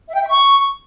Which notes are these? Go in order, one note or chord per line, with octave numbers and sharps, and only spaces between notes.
E5
G5
E5
C#6